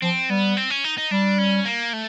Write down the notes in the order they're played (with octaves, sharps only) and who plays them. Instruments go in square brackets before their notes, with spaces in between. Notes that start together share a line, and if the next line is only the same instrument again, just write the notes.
[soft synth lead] F3 [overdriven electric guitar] C4
[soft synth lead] G3 [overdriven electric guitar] B3
[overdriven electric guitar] C4
C#4
D#4
D#4
[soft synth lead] G3 [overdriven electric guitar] D4
[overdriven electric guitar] C#4
A#3
A3